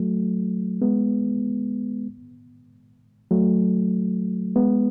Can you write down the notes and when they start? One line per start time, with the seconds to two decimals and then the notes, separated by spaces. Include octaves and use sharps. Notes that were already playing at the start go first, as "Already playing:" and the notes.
Already playing: F#3 A3
0.82 G#3 B3
3.31 F#3 A3
4.56 G#3 B3